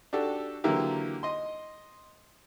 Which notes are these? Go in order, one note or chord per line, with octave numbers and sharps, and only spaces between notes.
D4 F#4 G4 A4
D3 E3 F#3 A#3 E4 G4
D#5 C6